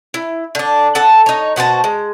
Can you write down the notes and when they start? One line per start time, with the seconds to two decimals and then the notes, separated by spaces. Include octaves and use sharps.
0.14 E4
0.55 D3 D4
0.95 A4 F#5 A5
1.26 D#4 C#5
1.56 B2 F#4 C5 A5
1.84 G#3